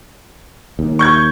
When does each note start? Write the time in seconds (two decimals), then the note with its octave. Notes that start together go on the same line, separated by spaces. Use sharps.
0.79 D#2
0.99 C#6 G6 G#6